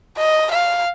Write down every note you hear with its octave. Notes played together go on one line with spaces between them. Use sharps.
D#5
F5